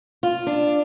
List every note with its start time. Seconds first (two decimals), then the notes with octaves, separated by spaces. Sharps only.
0.23 F4
0.47 D4